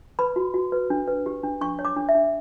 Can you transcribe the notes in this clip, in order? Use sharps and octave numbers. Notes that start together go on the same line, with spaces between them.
B4 B5
F#4
F#4
B4
D4
B4
G4
D4
D4 C#6
C#5
D6
D4
E5
D4